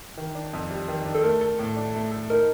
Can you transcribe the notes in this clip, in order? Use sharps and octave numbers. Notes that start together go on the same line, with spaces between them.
D#3
D4
F2
G3
D#3
D4
A4
A3 A#4
A4
A2
D4
A3
A4
D#4 A#4